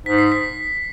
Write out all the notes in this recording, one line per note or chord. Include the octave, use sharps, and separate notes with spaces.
G#2 B6
C7
B6